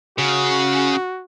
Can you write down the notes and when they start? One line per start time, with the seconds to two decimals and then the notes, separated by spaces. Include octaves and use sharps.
0.18 C#3 F#4